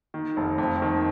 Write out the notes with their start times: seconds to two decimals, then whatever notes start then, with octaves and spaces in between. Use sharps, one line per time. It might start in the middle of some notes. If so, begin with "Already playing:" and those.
0.14 D#3
0.37 F1
0.58 F2
0.82 D#3